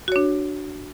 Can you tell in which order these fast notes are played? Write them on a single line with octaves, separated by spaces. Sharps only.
F#4 C#5 D4